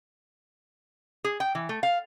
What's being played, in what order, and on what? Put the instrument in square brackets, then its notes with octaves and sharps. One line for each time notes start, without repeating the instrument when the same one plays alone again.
[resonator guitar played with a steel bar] G#4
G5
E3
A3
F5